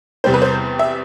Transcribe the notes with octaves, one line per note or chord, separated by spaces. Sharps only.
E2 C3 G3 C4 C5
B4
C5
E5